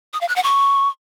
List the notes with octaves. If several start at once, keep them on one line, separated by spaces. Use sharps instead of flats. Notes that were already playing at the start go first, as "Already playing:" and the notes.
D#6
F5
F#6
F#5
C#6